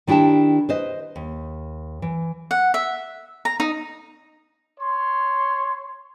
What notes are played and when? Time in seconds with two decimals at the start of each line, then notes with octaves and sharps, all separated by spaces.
0.07 D#3 D4 E4 G4 G5 A5
0.69 B4 C5 D#5
1.16 D#2
2.02 E3
2.51 F#5
2.74 E5
3.45 A#5
3.60 D#4
4.79 C#5 C6